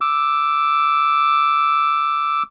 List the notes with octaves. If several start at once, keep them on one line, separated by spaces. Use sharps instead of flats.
D6 E6